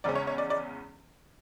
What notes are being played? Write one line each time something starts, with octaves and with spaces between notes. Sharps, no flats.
E2 C#3 G#3 C#4 D5
C#5
C#5
D5
D5